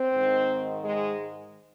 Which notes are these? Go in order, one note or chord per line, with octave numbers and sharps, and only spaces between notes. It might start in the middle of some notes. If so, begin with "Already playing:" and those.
Already playing: C4
G#2 D#3
G#3